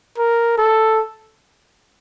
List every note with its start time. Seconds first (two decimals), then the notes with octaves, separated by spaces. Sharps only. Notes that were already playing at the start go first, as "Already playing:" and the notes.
0.18 A#4
0.58 A4